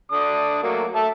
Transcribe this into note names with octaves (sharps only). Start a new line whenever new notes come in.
D3 D4 D#6
F#3 A3 A#3
A4 E5 A5